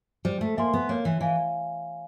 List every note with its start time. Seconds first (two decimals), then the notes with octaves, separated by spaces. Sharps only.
0.25 G3 C5
0.41 A3
0.57 A#3 E5 G#5 C6
0.73 B3
0.89 A#3 C#5
1.05 E3
1.21 E3 F5 G#5